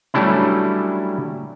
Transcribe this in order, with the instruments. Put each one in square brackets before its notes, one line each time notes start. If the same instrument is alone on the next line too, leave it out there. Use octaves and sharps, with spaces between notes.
[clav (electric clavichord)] F#3 G3 A3 C#4 D4 E4